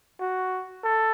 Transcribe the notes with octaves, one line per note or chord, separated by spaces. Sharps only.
F#4
A4